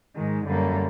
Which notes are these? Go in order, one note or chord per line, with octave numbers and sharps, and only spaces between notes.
G#2 D#3 G#3
F#2 D3 G3 A#3